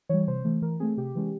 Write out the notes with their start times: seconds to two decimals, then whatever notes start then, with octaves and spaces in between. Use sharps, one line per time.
0.09 E3 G3 C#5
0.27 C3 C5
0.45 E3 A3
0.62 E3 A#4
0.80 A3 C4 G#4
0.97 C3 G4
1.15 E3 G#3 C#4